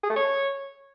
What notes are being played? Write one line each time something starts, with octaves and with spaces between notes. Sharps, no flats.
G#4
A3
C#5